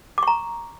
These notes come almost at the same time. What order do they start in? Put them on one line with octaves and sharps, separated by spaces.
D6 C#6 A#5